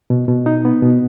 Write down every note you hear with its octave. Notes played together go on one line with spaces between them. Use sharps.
B2
B2
D#4
B3
B2